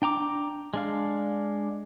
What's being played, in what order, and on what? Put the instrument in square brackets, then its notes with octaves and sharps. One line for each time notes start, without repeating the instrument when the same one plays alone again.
[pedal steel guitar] D4 G5 A#5 D6
G#3 D4 F5